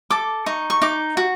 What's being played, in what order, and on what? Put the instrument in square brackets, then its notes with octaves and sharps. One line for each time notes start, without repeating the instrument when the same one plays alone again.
[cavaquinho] A4 D6
D#4 C#6
C#6
D#4 D6
F#4